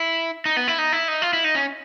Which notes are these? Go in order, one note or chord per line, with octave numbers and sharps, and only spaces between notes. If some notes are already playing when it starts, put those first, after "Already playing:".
Already playing: E4
D#4
B3
E4
D#4
E4
D#4
F4
E4
D#4
C#4